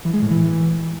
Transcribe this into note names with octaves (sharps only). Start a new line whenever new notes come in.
E3
G#3
A2
E3